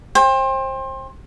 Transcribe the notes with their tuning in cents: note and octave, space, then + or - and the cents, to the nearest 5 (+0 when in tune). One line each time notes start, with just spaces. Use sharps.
C5 +30 G5 +30